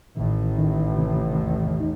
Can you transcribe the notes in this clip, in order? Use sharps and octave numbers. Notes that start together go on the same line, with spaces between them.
A1 A2 D#3
D#3
C3
E2
D#4